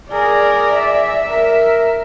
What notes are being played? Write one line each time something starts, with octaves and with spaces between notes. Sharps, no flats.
G#4 A#4 D5
E5
A#4